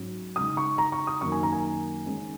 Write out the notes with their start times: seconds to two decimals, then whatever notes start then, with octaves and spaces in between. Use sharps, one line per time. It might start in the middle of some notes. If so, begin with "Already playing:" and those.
Already playing: G#2 F#3 C#4
0.36 C#3 G#3 D#4 D#6
0.57 C#6
0.78 A#5
0.92 C#6
1.07 D#6
1.21 F#2 D#3 A#3 D#4 C#6
1.32 G#5
1.43 A#5
1.52 G#5
2.06 D#3 G#3 C#4